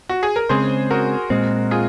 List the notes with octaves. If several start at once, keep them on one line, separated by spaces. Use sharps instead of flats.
F#4
G#4
A#4
C#3 G#3 C4 G#4 C5
F#4 A#4
A#2 G#3 C4
F4 G#4